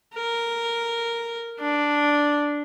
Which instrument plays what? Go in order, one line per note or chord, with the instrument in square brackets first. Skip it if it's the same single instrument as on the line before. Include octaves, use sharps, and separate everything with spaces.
[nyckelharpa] A#4
D4